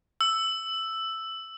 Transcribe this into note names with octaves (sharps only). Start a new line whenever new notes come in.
E6